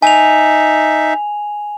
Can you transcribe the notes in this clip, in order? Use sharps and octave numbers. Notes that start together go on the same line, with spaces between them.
D#4 E5 G#5 F7